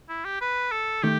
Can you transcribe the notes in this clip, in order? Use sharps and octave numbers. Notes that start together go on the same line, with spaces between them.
E4
G4
B4
A4
D#3 A3 G4